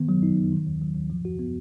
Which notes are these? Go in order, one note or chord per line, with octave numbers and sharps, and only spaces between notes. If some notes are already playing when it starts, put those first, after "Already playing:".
Already playing: D#3 B3
F#3
D#4
F#3
D#3
D#2
F#3
D#2
F3
F#4
B3